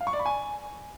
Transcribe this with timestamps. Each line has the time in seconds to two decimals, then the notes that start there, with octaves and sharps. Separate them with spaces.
0.01 F5
0.07 C#6
0.13 D5
0.19 B5
0.26 G#5